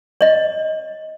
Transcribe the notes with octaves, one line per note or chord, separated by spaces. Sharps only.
C#5 D#5